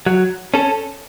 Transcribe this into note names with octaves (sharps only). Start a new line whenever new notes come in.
F#3
C#4 A4